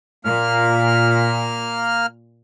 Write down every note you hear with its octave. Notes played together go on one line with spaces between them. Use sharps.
A#2 A#3 F6